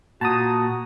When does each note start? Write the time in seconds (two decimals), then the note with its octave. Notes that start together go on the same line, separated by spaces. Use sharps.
0.21 A#2 F#4 A5 A#5 D#6